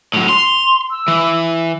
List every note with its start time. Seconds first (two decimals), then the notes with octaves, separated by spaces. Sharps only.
0.14 A2 F#3 F7
0.29 C6
0.91 E6
1.08 E3